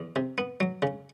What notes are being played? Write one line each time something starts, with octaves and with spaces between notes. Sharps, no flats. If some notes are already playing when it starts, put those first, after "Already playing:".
Already playing: E2
C3
B3
F#3
C#3